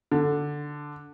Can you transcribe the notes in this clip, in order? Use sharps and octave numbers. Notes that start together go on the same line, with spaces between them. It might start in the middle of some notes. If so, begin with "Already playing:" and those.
D3